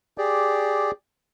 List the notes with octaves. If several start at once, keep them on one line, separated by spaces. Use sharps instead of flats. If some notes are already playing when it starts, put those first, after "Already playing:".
G4 G#4 D5